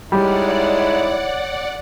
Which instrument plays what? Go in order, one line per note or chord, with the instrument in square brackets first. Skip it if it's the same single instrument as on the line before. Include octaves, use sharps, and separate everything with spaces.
[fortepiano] G3 [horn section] G#3 D#4 E4 [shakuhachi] C#5 [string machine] D5 F#5